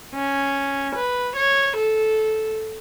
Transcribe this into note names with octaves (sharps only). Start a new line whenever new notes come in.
C#4
B4
C#5
A4